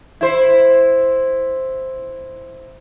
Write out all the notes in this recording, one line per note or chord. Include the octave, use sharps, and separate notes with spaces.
E4 C5